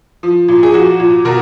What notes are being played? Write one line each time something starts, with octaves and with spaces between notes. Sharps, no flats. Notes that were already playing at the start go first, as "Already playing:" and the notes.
F3
A#2
G#4
F3 F#4
A#2
B2 A#4